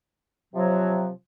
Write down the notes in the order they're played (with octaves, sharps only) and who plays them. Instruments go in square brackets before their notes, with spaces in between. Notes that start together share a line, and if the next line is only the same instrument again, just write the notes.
[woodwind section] C3 F3 F#3